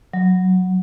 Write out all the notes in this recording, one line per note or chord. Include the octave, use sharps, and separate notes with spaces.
F#3